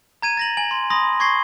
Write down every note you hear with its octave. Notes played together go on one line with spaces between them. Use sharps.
A#5 G#6 D#7
A6 A#6 F#7
G#5 F#7
C6
B5 C6 D#6 A#6
C#6 G#6 A#6 C7 G7